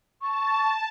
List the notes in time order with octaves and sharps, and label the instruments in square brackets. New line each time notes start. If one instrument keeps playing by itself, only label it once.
[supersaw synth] A5 [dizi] C#6